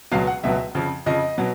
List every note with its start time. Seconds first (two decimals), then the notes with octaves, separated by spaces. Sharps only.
0.11 C#2 B2 F#3 F5
0.27 F#5
0.43 C#2 B2 F#3 E5
0.75 F2 C#3 F3
1.06 F2 C#3 F3 D#5
1.38 B2 F#3